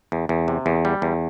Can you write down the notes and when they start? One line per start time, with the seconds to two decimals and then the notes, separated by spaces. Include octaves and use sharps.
0.12 E2
0.29 E2
0.48 C3
0.66 E2
0.85 G3
1.02 E2